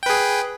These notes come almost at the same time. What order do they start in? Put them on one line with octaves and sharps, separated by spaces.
G5 B4 G#4